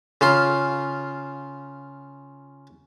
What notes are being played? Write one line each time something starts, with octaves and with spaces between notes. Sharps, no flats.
C#3 F4 C6